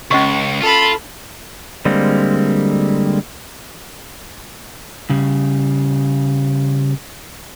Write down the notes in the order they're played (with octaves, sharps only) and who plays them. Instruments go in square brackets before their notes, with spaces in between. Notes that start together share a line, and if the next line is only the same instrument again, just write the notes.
[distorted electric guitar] C#2 [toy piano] C#4 D#5 C#6
[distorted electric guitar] F4 [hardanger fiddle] A4 B5
[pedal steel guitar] D3 G3 G#3 A#3 C4
[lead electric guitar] C#3 G3